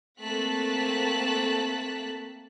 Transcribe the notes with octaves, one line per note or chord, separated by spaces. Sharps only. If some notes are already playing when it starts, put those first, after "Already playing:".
A3 A#3 C4 A5 F#6 B6